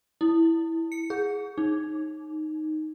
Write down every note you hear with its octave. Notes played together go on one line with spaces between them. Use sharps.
E4
C#7
G#4
D#4